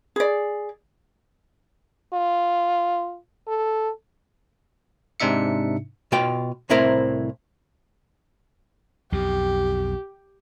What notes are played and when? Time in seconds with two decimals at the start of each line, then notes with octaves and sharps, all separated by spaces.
0.16 G#4 D5
2.14 F4
3.48 A4
5.20 G#2 C3 D4 D#4 E5 C#7
6.12 B2 F4 G5
6.70 C2 A2 C4 E4 A#4 A#5
9.12 B1 F2 B2 G4